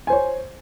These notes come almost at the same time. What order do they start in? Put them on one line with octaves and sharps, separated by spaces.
G#5 C5 C#5